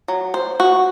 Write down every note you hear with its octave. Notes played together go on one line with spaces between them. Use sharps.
F#3
C5
F#4